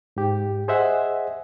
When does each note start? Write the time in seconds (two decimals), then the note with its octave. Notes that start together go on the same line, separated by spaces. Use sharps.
0.17 G#2 G4
0.68 G#4 C5 D#5 E5 F#5 G#5